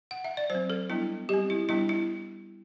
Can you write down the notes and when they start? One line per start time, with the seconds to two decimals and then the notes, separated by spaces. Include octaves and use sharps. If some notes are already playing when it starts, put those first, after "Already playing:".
0.11 F#5
0.24 E5
0.37 D5
0.50 F#3 C5
0.55 C4
0.70 A4
0.90 G3 B3 D4 E4
1.29 G3 C4 G4
1.50 E4
1.69 G3 B3 D4 E4
1.89 E4